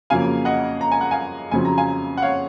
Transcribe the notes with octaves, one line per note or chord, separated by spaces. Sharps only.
F2 C#3 F#3 A#3 F5 G#5
D#5 F#5
A#5
G#5
F#5
F5 G#5
F2 C#3 F#3 C4 G#5
A#5
F5 G#5
F#5
C#5 F5